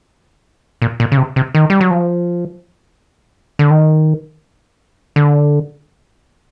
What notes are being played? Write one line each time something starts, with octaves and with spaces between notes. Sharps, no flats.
A#2
A#2
C#3
C3
C3
D#3
G3
F#3
F3
D3
D#3
D3